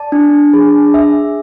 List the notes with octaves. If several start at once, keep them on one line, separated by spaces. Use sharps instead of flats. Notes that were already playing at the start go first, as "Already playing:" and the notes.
Already playing: D5 A5
D4
G#4
E5